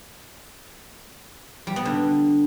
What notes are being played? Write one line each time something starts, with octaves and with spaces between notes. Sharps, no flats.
G3
B3
D3